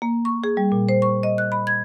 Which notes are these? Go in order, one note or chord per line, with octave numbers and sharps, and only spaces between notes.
A#3
C#6
G#4
G3
A#2
C5
C#6
D#5
F#6
B5
G#6